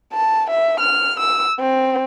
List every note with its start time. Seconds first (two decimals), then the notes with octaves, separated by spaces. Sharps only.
0.13 A5
0.50 E5
0.80 F6
1.20 E6
1.59 C4